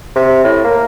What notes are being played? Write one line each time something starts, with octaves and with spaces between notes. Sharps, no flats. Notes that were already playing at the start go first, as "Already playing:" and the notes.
C3
A2
A#3